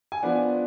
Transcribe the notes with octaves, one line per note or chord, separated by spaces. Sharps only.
G#5
F3 B3 D4 F#5